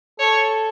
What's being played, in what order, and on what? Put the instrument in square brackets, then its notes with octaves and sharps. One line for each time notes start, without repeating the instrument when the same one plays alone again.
[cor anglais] A4 [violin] C#5